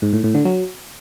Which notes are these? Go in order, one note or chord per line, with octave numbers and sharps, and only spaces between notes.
G#2
A2
A2
D3
F#3